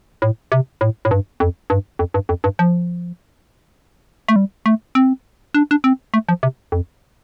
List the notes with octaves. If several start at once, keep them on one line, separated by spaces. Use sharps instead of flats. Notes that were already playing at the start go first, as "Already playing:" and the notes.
A2
C3
A2
A2
G2
F2
G2
F2
G2
F2
G2
F3
A3
G3
A3
C4
D4
D4
C4
A3
F3
C3
F2